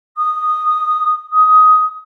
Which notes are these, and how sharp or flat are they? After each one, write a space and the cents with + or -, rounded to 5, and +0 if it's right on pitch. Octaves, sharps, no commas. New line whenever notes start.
D#6 -10
D#6 +15